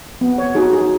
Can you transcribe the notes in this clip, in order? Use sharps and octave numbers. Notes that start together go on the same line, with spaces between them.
B3
C#5
D#4 F#4 G#4
G#4